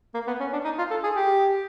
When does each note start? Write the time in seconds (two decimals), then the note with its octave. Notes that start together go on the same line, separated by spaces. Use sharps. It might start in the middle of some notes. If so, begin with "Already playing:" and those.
0.14 A#3
0.27 B3
0.40 C#4
0.53 D4
0.65 D#4
0.78 F4
0.91 A4
1.03 G#4
1.16 G4